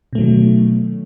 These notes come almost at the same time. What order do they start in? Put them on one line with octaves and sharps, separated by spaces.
B2 A3 F#3 D#3